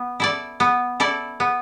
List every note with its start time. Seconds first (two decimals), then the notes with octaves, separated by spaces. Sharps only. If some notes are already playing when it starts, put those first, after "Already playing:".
Already playing: B3
0.20 E4 A4 D5
0.60 B3
1.00 E4 A4 D5
1.40 B3